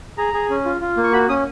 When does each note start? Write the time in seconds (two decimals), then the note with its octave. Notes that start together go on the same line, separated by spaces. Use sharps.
0.18 G#4 A#5
0.34 G#4
0.50 C#4
0.65 F4
0.81 F4
0.97 A#3
1.04 C#6
1.13 F#4 B5
1.29 C#4 D#6